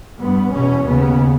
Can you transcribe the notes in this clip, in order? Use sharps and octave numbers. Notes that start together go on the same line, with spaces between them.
G2 B3
E2 B2 C#4
D#2 C#3 B3